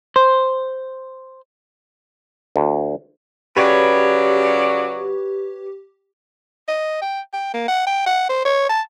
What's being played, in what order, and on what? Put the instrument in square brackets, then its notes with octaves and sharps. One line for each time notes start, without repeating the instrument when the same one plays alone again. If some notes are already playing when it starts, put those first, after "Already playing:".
[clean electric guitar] C5
[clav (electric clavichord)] D2
[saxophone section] C#3 F#3 D5 [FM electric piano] G4 [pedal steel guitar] B4 C#5
[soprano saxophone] D#5
G5
G5
A#3
F#5
G5
F#5
C5
C#5
A5